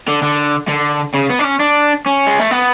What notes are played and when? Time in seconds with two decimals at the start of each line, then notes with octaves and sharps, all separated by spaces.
0.08 D3
0.23 D3
0.68 D3
1.15 C#3
1.30 B3
1.39 D4
1.44 C#4
1.60 D4
2.06 C#4
2.27 G#3
2.39 A3
2.51 B3